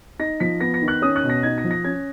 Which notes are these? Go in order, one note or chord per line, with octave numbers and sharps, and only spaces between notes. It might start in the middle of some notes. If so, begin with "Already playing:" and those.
D#4 A#6
F3 B6
B3 A#6
A#6
D#3
F#6
C#4 D#6
F#6
B2
A#6
D#4 G#6
A#6
F3
A#6
C#4 G#6